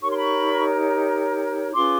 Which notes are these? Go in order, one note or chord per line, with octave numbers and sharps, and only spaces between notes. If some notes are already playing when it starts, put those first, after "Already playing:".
D#4 G4 A#4 C#5 C#6
C6
B5 C#6
C#4 F4 G#4 B4 C6 D6